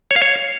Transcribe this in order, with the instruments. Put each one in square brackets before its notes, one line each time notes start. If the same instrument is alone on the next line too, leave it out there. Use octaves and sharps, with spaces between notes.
[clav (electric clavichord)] C#5
F5
C#5